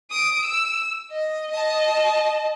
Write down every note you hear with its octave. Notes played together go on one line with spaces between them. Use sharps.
D#6 D7
E6
D#5
D#5 A5